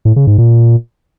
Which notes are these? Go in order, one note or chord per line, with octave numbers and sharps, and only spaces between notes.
A2
C#3
G#2
A#2